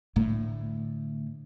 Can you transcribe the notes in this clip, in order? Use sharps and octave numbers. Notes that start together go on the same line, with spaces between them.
A2 D3